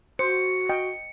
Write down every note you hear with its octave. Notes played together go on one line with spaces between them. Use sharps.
F#4 C5 C#7
D#5 G5